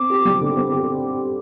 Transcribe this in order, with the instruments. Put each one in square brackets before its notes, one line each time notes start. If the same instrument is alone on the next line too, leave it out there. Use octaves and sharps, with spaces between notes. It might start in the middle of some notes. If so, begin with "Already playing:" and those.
Already playing: [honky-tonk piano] C4 [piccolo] D6
[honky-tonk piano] G4
G3
D3
C4
G4